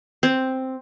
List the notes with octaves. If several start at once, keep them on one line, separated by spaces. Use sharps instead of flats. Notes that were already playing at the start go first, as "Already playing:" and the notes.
C4